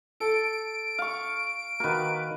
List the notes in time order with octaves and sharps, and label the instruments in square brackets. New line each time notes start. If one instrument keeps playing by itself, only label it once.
[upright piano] A4 [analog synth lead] D7
[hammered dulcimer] F5 C#6
[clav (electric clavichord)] D#3 A#3 [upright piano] F#4 [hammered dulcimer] A#4 B4